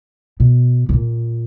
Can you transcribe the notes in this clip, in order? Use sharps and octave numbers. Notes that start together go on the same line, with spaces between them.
B2
B2
A#2